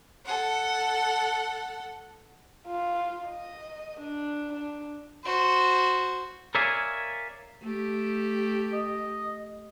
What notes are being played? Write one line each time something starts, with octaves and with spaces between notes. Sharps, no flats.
A4 F#5
F4
D#5
D4
D4
F#4 C5
A#4 C#5 D5 E5 F5 G#5
A3 G4
D#5